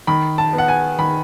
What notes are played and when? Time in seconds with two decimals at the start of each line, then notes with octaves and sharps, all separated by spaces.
0.07 D#3 B5
0.38 A5
0.53 B3
0.58 F#5
0.68 G#5
0.99 D#3 B5